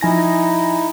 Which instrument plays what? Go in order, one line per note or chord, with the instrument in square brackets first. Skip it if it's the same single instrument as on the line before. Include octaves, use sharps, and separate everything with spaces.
[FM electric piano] F3 G#5 A#6 [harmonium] D#4 E4